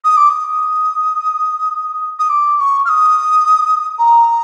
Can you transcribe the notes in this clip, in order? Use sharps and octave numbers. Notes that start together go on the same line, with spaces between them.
D#6
D6
D#6
D#6
D6
D6
C#6
F6
D#6
A#5